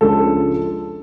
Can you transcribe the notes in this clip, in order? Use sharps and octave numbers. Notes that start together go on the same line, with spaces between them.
C#2 C#3 F3 G#3 D4 A4